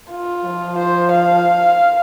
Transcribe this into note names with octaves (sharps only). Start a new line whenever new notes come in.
F4
F3
C5
F5